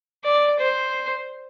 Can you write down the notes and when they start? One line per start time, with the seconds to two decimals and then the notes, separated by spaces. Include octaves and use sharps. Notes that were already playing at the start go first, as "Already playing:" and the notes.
0.24 D5
0.60 C5